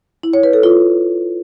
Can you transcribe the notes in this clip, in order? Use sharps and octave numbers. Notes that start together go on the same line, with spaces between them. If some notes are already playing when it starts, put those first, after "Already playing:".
E4
C#5
B4
A4
F4